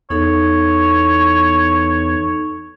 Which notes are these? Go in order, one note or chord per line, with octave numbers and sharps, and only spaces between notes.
E2 D#4 A4 C#5